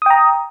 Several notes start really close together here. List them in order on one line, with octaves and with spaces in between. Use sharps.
D#6 G5 A#5